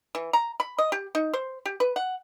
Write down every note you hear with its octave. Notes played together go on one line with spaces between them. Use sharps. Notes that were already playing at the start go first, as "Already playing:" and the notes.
E3
A#5
B5
D#5
G4
D#4
C5
G4
B4
F#5